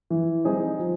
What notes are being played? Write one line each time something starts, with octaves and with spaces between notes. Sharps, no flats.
E3
G3 C4 D#4 G#4
F3